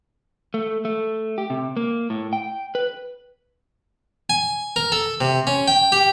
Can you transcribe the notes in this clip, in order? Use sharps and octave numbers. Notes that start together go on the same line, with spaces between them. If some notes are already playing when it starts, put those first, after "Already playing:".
A3
A3
G4
C3
A#3
A2
G5
B4
G#5
A#4
A4
C3
C#4
G5
G4